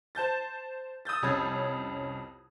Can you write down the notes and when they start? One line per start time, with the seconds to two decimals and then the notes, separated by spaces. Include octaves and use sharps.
0.15 C5 A5 G6 A6
1.05 D#6 E6 G6 A6
1.22 C2 F2 C#4 B5 G#6